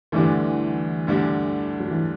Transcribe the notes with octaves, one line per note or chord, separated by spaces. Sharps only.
D2 D3 E3 G3 D4
D2 D3 G3 D4
F#3
E3